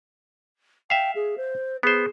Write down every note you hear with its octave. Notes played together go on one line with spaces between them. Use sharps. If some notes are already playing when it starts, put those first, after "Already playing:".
E5 F5 G5
G#4
C5
B3 G#4 C5